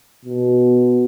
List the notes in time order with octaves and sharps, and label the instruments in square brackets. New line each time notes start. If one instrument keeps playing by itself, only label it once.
[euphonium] B2